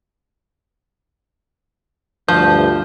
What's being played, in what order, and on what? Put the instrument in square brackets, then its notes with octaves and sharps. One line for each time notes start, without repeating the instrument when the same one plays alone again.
[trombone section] D2 G2 [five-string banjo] F3 [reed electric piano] G6